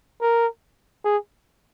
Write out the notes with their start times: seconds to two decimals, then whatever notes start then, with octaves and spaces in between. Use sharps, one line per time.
0.22 A#4
1.05 G#4